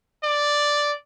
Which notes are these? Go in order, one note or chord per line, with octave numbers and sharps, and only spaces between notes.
D5